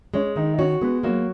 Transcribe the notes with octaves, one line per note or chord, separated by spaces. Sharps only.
G#3 C#4 C#5
D#3 D#4 D#5
D#5
C#4 F#4 C#5
G#3 B3 B4
F#3 A#3 F#4